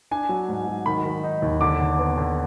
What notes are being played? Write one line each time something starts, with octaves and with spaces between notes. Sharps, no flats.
D4 G#5
F#3
G#2
F#3
D#3 B5
D#3
D#4
D#2
D3 D6
D3
B3
D3